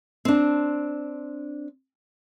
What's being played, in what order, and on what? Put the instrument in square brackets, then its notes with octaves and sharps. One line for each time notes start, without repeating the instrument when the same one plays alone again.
[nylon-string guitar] C4 D4